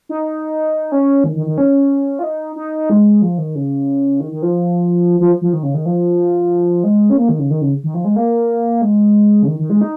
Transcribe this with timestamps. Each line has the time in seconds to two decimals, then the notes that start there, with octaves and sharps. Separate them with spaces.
0.09 D#4
0.92 C#4
1.24 D#3
1.36 D#3
1.46 D#3
1.58 C#4
2.19 F4
2.23 D#4
2.56 D#4
2.90 G#3
3.22 F3
3.38 D#3
3.55 C#3
4.20 D#3
4.32 D#3
4.42 F3
5.20 F3
5.42 F3
5.53 D#3
5.63 C#3
5.74 D#3
5.86 F3
6.84 G#3
7.10 C#4
7.17 A#3
7.29 D#3
7.39 C#3
7.50 D#3
7.61 C#3
7.84 D#3
7.94 F3
8.05 G#3
8.16 A#3
8.82 G#3
9.43 C#3
9.47 D#3
9.59 D#3
9.70 G#3
9.81 D#4